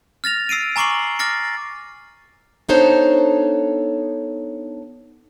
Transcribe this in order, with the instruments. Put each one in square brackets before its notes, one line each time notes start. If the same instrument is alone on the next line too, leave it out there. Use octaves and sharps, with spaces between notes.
[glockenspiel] F6 A6 A#6 F7
E6 C7 D7 D#7
G#5 A#5 C#6 D6 C7 F#7
D6 F6 A6 A#6 C#7
[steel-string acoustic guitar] B3 D4 D#4 A4 C5 C#5